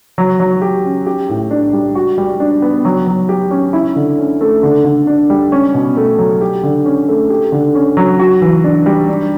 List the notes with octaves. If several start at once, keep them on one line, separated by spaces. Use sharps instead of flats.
F#3
F#3
G4
C#4
G4
A2
D4
G3
F#4
G3
D4
B3
F#3
F#3
G4
C#4
E4
D3
C#4
A3
D3
D3
D4
G3
C#4
B2
A3
F#3
G4
D3
C#4
A3
G4
D3
C#4
F#3
F#4
E3
D4
G3
D4